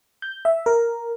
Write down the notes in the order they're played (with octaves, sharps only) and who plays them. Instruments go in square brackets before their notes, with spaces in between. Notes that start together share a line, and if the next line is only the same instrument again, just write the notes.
[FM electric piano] G6
E5
A#4